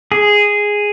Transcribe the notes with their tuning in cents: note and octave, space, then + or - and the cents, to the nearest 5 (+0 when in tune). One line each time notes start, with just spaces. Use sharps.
G#4 -5